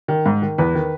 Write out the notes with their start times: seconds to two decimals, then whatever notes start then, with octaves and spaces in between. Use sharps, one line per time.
0.08 D#3
0.26 G#2
0.42 D#3
0.58 E2 B4
0.75 D#3